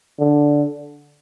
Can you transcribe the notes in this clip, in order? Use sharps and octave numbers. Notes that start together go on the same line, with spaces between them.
D3